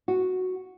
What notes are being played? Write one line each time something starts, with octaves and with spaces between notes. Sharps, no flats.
F#4